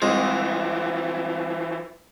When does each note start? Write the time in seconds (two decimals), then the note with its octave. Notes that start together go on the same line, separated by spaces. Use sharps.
0.02 C2 E3 F3 G#3